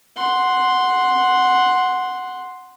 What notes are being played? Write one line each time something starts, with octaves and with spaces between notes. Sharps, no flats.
F#5 C6